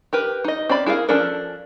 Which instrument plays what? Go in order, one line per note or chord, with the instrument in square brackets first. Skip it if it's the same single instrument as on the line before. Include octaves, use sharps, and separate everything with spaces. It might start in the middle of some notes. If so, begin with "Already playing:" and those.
[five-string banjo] G4 A#4 B4
D#4 D#5
C4 C#4 D5 B5
E4 G#4 A#4 F5
F3 C#4 D4 A4 A#4